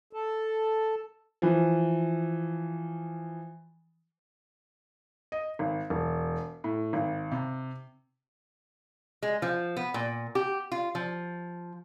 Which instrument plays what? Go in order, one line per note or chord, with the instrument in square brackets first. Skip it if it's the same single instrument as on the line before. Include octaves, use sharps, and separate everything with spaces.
[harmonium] A4
[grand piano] E3 F3
[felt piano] D#5
G#1
E1
A2
G#1
C3
[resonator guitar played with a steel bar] G#3
F3
B3
A#2
G4
F4
F3